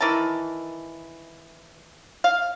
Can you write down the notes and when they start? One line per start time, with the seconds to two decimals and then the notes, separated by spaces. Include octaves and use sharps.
0.01 D#3 E3 A#4 A5
2.24 F5